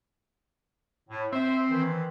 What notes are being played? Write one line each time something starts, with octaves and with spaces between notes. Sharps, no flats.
A2
C4 C5 E5
D#3 E3